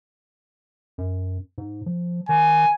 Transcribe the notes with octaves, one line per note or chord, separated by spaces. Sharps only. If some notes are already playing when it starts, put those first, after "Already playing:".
F#2
G#2
F3
D#3 G#5